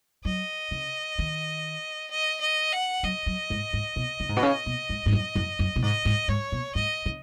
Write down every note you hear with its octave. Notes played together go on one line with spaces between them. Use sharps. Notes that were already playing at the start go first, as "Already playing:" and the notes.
F#3 D#5
C#3
D#3
D#5
D#5
F#5
F#3 D#5
F#3
G#2
G#2
B2
C#3
G#2
B2
C#3
B2
G#2
G#2
F#2
F#2
F#2
B2
G#2 D#5
G#2
G#2 C#5
B2
G#2 D#5
C#3